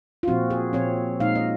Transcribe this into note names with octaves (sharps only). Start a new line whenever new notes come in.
F4
A#2 F3 C4 F#4
G#4
A#2 F3 C4 C#5
A#2 G#3 D#4 F5
D#5